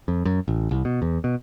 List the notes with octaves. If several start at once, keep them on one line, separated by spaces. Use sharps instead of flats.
F2
F#2
A1
C2
B2
E2
B2